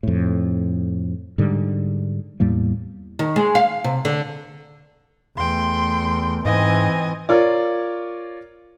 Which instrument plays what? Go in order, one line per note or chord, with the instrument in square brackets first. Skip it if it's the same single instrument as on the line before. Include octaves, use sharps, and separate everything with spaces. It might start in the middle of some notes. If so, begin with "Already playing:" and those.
[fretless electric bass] F2 A2
G#2 D3 G3
E2 A2 G3 A#3
[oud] D#3
G#3
F5
C3
D3
[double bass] E2 A3 [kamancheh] G5 C6
[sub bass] G#2 [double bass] E3 C4 [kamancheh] D#5 G#5
[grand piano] F4 A#4 C#5 D5